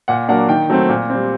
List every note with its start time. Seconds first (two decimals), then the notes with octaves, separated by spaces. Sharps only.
0.08 A#2 F#5
0.28 F#3 A#3 D4 F#5
0.48 D#3 G5
0.70 F#3 A3 C4
0.89 A#2
1.10 G3 C4